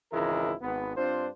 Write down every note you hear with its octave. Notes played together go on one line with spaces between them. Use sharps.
G#1 C#2 E3 G#3 E4 A#4
G#1 B3
G2 C4 D4 F4 C5